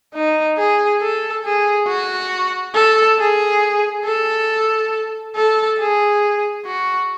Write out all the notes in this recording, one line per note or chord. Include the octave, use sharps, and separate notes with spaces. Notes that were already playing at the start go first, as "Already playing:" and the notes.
D#4
G#4
A4
G#4
F#4
A4
G#4
A4
A4
G#4
F#4